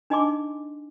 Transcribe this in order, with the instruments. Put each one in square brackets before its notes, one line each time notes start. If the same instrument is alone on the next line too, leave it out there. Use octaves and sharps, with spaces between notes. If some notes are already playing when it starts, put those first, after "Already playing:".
[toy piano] D4 D#4 D#5 G#5 C6 D6